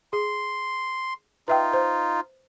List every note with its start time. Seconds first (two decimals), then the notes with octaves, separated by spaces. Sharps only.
0.13 G#4 C6
1.48 D#4 F4 B4 E5 G5
1.73 C5